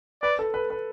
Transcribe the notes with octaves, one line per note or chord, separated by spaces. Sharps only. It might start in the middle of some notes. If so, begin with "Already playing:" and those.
B4 D5
A4
B4
B4